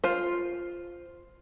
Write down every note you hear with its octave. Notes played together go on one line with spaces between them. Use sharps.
F4 C5